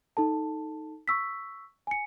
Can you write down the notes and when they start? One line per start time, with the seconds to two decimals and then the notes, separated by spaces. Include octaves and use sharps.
0.17 D#4 A4 A5
1.08 C#6 E6 B6
1.87 G#5 C#7